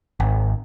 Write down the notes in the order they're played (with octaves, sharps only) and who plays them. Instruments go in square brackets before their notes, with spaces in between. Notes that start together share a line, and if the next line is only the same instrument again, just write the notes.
[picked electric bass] G#1